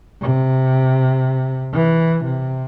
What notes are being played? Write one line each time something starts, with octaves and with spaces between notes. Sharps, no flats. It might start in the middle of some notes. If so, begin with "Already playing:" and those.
C3
E3
C3